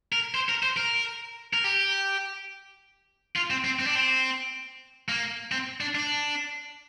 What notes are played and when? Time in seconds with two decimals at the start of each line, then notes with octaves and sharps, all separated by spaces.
0.12 A#4
0.34 C5
0.49 A#4
0.63 C5
0.77 A#4
1.53 A#4
1.64 G4
3.36 F4
3.50 C4
3.64 C4
3.79 C4
3.86 D4
3.95 C4
5.09 A#3
5.52 C4
5.80 D4
5.95 D4